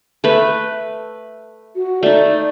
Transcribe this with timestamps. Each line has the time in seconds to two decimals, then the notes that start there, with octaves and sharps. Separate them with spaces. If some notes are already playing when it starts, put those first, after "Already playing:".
0.24 A3 B4
1.76 F#4
2.03 A3 D#4 D5